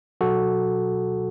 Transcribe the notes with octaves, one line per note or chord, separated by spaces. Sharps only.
B2 F#3 F#4 A4